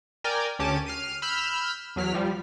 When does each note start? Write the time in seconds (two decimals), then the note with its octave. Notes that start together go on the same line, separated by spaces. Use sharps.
0.24 A#4 D5 G5 G#5
0.59 D2 C#4 G4 A5 D6 D#7
0.86 F6 C7 D#7
1.22 B5 E6 F6 G6
1.96 E2 F#3 F6 B6
2.14 F3 G3